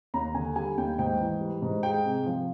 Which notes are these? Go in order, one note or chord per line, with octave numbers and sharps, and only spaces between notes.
D#2 A#5
D3 G#5
G3 G#5
D#2 G5
G#2 G5
E3
G3
G#2
G#3 G5
C3
F3